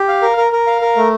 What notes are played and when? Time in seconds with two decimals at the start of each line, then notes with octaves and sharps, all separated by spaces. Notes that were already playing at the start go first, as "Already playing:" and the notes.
Already playing: G4
0.08 F5
0.22 A#4
0.37 A#4
0.52 A#4
0.67 F5
0.82 A#4
0.97 A3